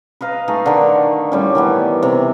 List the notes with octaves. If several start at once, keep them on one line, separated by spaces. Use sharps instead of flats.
B4 D#5 F5 A#5
A3 D#4 G#4
D3 D#3
A2 G3 C#4
D#3 E3 B3
C3